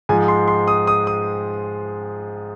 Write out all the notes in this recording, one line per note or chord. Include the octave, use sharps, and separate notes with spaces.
G#2 F3 G#3 G#5
C6
C6
D#6
D#6
D#6